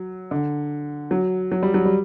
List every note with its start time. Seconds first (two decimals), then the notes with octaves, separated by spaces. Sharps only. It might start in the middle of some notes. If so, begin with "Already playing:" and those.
Already playing: F#3
0.31 D3
1.11 F#3
1.52 F#3
1.63 G3
1.74 F#3
1.85 G3